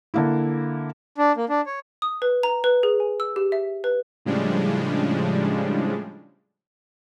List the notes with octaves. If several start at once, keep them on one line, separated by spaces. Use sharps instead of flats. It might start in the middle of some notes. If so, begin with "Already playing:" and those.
D3 A#3 E4
D4
A#3
D4
C#5
D#6
B4
A#5
B4
G#4
G#5
E6
G4
E5
B4
A2 C#3 F3 G3 G#3 D4